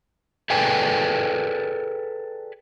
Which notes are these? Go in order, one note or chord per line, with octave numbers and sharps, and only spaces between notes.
G#4 A4 B4 D5 G5 G#5